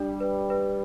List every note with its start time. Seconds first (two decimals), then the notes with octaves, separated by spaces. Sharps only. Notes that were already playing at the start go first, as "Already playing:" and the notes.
Already playing: G3 D4
0.20 B4
0.50 B4